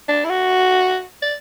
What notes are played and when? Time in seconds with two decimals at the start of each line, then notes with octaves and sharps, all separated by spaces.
0.08 D4
0.25 E4
0.29 F#4
1.22 D5